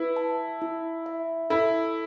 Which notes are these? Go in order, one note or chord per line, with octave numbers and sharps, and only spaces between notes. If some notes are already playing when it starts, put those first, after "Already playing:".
Already playing: E4 B4
A5
E4
E5
E4 A4